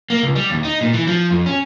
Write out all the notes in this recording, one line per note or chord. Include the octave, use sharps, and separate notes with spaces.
A#3
C#2
G3
D#2
D#4
A#2
E3
F3
F2
C#4